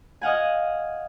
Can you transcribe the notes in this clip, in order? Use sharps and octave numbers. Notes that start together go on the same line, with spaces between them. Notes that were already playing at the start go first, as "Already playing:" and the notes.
D#5 F5 F#5 G#5